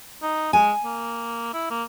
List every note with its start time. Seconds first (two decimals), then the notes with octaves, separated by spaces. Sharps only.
0.22 D#4
0.53 G#3 G#5
0.84 A#3
1.54 E4
1.70 A#3